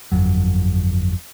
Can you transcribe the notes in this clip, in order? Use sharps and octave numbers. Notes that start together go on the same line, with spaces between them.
G1 F2 F#3